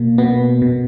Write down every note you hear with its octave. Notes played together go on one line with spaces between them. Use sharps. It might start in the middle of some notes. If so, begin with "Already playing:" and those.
Already playing: B2 A#3
B2 B3
B2